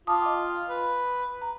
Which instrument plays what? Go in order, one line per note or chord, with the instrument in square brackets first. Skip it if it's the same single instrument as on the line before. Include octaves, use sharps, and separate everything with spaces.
[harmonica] F4 [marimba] A5 D6 D#6
[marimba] D#5 F5 G5
[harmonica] B4
[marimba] A#5